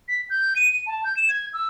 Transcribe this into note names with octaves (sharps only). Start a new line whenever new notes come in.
B6
G6
D#7
A5
G6
E7
G#6
E6